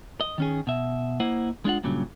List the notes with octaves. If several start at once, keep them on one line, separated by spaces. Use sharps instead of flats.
D#5
D#3 C#4 G#4
B2 E5
A#3 E4 C5 D#5 F#5
G#3 D4 F4 F#5
G2 A#2 C#3 F#3